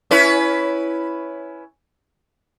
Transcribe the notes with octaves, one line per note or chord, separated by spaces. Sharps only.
C#4 E4 B4